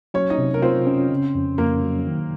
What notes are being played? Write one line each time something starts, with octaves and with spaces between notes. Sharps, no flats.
F#3 C#4 C#5
D#4 D#5
C3
A#4
C4 F4 C5
C#4
C#3
F2
F2 A#3 A#4
F#3
D#3